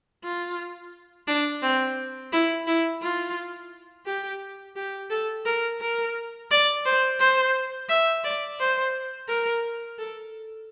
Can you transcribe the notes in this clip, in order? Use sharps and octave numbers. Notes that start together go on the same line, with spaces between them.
F4
D4
C4
E4
E4
F4
G4
G4
A4
A#4
A#4
D5
C5
C5
E5
D5
C5
A#4
A4